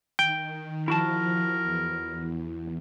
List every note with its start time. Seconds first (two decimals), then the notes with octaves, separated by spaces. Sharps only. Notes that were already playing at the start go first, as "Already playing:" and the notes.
0.19 D#3 G5
0.88 F3 E4 F#4 A#4 A5
1.63 E2